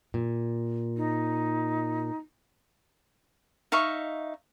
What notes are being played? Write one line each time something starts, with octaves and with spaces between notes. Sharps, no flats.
A#2
D#4
D#4 E5 F5 C#6